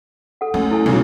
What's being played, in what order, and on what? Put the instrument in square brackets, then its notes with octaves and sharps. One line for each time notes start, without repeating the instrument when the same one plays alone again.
[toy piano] A4 F#5
[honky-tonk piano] F#2 [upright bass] A3
[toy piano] E4 A4 G#5
[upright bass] B1 [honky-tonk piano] A#2 C#3 F#3